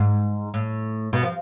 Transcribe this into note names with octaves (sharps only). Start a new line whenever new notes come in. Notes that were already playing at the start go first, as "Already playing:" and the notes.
Already playing: G#2
A2
B2
F3